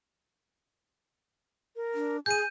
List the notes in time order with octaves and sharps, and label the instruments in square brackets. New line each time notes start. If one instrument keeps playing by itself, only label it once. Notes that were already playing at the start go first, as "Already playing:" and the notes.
[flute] A#4
[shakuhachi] D4
[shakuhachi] G#4 [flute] G#5 [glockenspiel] G6 D#7